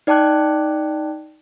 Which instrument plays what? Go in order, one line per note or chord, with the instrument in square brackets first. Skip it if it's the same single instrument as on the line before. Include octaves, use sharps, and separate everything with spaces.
[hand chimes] D#4 D5 G5 A5 D6 F#6